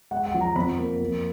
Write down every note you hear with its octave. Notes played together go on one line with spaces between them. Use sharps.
G#3 F#5
F#5
F3
A#5
F2 B5
A#3
F2